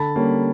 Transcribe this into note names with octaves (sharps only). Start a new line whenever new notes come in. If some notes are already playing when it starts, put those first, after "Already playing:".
Already playing: D3 A5 B5
G3 A#3 C#4